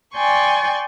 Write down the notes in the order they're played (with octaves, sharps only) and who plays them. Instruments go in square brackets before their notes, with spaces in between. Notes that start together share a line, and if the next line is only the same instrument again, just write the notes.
[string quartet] D5 G5 G#5 C6 C#6